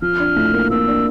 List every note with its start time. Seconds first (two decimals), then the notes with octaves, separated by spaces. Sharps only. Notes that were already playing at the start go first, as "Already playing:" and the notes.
0.02 F3 F6
0.20 D4
0.36 A2
0.53 A#3
0.70 A#3 E6
0.87 D4